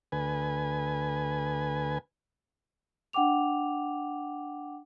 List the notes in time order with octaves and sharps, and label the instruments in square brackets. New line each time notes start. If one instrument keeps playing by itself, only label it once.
[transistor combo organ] D2 B4 G#5
[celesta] D4 F#5 G5 D6 F7